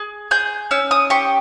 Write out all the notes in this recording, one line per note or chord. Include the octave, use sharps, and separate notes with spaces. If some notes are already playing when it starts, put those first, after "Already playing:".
Already playing: G#4
G#4 G6
C#4 E6
D#6
G4 C#6